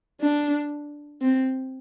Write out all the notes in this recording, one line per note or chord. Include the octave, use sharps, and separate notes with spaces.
D4
C4